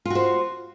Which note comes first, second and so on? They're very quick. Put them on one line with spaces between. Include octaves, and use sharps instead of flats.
F4 F#4 C5